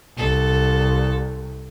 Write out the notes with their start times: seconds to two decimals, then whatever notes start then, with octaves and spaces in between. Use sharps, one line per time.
0.17 C2 A4